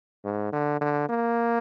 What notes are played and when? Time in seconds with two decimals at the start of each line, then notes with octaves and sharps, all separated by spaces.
0.24 G#2
0.52 D3
0.81 D3
1.09 A#3